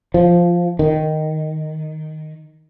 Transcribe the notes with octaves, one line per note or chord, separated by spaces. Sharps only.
F3
D#3